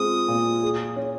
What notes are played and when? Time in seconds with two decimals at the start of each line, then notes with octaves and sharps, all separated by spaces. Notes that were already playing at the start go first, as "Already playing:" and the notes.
Already playing: G#3 C4 F4 D#6
0.28 A#2
0.62 G#4
0.96 C#4